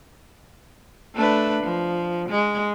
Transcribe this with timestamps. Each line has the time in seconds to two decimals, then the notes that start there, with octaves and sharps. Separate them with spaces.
1.15 A3 D4 B4
1.64 F3
2.29 G#3